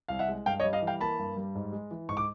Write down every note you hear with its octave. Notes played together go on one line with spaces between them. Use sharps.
C2 F5
E5 F#5
G#3
G2 F5 G5
C#5 D#5
G3
D#5 F5
E3
F5 G5
A#3 A5 B5
G2
G3
G#2
G#3
E3
G#2 C#6
D6